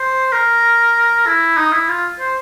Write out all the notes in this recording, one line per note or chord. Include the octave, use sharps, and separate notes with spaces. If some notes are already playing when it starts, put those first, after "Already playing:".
Already playing: C5
A#4
E4
D#4
E4
F4
C5